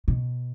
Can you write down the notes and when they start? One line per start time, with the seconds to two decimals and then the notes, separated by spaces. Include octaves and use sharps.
0.08 B2